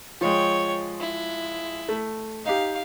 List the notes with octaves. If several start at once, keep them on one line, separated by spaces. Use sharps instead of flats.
F3 G#3 C#5 G5
E4
A3
D#4 G4 F5